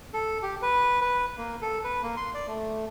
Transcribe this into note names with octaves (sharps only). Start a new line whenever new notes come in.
A4
G4
B4
B4
A#3
A4
B4
A#3
C6
D5
A3